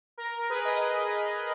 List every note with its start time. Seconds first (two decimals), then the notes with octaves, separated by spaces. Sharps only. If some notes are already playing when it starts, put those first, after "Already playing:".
0.17 A#4
0.38 A#4
0.50 G#4 B4
0.65 B4 D#5